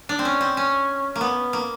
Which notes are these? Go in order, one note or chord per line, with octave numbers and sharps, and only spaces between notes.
D4
C4
C#4
C4
C#4
A#3
B3
A#3